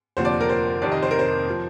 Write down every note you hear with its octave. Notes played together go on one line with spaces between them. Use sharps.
F1 D#2 D3 F3 C5
D5
A#4
C5
F1 F2 C3 D#3 D5
D#5
C5
A#4
C5
F3